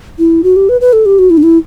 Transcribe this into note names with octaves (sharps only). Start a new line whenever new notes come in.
E4
F#4
G4
B4
B4
A4
G4
F#4
E4
D4
E4